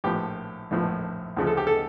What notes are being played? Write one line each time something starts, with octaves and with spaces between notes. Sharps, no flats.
A#1 A2 F3 G4
A#1 A2 F3
D2 C#3 F3
A4
G4
A4